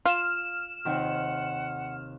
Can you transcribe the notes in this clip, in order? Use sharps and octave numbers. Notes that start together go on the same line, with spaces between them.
F4 F6 E7
D#2 C3 D#3 F#5